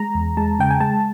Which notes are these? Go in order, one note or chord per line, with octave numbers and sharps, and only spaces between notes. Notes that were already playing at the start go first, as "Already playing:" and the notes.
Already playing: G#3 A#5
E2
G#3 A5
C#3 G5
G#5
G#3 A5